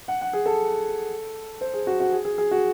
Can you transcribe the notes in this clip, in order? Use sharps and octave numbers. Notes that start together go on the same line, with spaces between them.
F#5
F#5
G#4
A4
C5
G#4
F#4
F#4
G#4
G#4
G#4
F#4